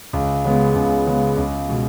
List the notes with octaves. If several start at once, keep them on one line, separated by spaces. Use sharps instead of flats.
C#2
C#3 G#3 B3
C#2
C#3 G#3 B3
C#2
B2 G#3